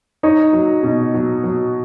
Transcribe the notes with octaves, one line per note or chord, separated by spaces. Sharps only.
D#4 C#5
F#3
B2
F#3
F#3